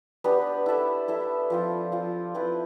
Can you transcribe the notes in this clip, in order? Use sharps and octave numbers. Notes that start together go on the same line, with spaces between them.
B3 D4 G4 B4
E4 A4 E5
E4 A4 E5
F3 C4 F4
F3 C4 F4
F3 C4 E4 B4